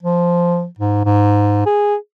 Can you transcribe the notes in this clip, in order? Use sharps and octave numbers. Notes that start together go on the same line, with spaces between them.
F3
G#2
G#2
G#4